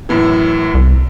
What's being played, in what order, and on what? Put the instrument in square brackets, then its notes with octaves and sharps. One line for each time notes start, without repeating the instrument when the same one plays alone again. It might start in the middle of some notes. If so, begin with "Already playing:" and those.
[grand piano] F#2 A2 E3
[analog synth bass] C2